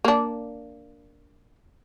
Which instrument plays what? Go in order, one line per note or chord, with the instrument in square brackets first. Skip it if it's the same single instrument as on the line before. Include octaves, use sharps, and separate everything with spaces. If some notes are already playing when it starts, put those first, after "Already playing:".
[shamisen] A#3 D4